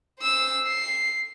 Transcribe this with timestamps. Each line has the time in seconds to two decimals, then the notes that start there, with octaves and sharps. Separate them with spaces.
0.19 C5 E6
0.67 C7